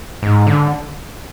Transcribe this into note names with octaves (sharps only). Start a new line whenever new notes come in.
G#2
D3